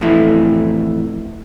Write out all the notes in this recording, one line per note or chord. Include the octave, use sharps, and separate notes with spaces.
F2 A2 E3 A3 E4